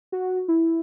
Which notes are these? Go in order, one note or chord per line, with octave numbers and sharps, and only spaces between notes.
F#4
E4